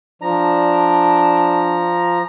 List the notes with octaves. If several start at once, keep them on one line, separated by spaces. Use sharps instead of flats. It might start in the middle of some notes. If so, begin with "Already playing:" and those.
F3 D4 A#5